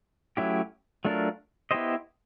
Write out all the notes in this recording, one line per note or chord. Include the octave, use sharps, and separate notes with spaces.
F#3 A3 C#4 E4 G4
F#3 A3 D4 F4 A#4
B3 E4 G4 C5 D#5